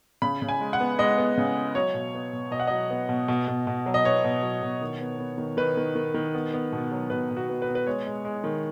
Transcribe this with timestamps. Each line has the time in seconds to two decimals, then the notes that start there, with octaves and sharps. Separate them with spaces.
0.22 C#3 B5
0.42 C#3
0.49 G#5
0.61 G#3
0.73 F#5
0.80 B3
0.99 G#3 D#5
1.18 B3
1.37 C#3
1.56 B3
1.75 F#3 C#5
1.94 B2
2.14 B3
2.33 B2
2.51 B2 D#5
2.60 F#5
2.67 F#3 D#5
2.90 B3
3.09 B2
3.28 B2
3.48 B2
3.67 B2
3.86 F#3
3.94 D#5
4.04 B3 C#5
4.24 B2
4.42 F#3
4.62 B2
4.81 D#3
5.01 B3
5.19 B3
5.38 D#3
5.57 D#3 B4
5.77 D#3
5.95 D#3
6.14 D#3
6.34 B3
6.53 B3
6.73 B2
6.92 F#3
7.10 B2 B4
7.30 B2
7.37 F#4
7.49 B3
7.62 B4
7.68 B3
7.75 B4
7.87 G#3 C#5
8.06 G#3
8.25 G#3
8.44 D#3